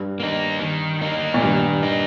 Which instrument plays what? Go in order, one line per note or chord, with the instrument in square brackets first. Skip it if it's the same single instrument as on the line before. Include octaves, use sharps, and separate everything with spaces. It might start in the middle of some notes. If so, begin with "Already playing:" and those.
Already playing: [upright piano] G2
[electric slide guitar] A#3 D#4
D#3
A#3 D#4
[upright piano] A#2
[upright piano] G2 [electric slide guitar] D#3
[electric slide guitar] A#3 D#4